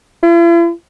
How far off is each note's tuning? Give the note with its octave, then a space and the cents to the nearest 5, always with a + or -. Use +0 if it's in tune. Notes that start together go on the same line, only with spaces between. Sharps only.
E4 +45